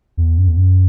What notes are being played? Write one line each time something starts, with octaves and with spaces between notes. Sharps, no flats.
E2
F#2
E2
F#2